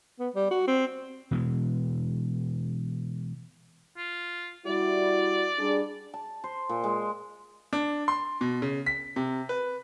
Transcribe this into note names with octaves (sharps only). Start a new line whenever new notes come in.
B3
G3
F#4
C4
B2 E3 G#3
F4
G3 E4 F#4 D5
G3 D4 G#4
A5
C5
A#2
G#3
D4
C6
B2
C#3
B6
C3
B4